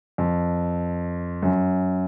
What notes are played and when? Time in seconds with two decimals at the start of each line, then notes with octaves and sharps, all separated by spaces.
0.18 F2
1.42 F#2